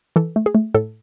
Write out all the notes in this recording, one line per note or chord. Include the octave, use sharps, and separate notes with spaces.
E3 A4
A3
G#4
A3
A2 A4